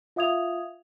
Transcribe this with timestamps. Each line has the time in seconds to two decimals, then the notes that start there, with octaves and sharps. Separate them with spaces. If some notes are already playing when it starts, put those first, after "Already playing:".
0.16 F4 E5 F5 D#6 G#6 F7